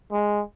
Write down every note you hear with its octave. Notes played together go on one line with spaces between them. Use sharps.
G#3